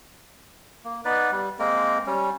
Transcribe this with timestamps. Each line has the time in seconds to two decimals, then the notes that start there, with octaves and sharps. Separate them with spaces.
0.84 A#3
1.05 B3 D#4 B4 D5
1.31 G3
1.59 G#3 A#3 C4 A#4
2.07 G3 C#4